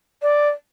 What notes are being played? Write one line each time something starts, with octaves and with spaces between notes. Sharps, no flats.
D5